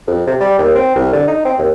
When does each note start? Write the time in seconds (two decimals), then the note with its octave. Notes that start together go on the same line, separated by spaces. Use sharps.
0.08 F2
0.27 C3
0.41 G3
0.59 D#2
0.75 C4
0.96 C2
1.13 D3
1.28 D#4
1.45 C4
1.58 D#2